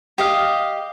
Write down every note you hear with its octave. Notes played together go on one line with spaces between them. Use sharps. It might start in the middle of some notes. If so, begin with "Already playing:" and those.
G4 D#5 F5